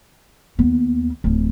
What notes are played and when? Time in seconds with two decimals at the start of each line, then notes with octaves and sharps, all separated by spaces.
0.58 D#2 B3
1.24 D1 F3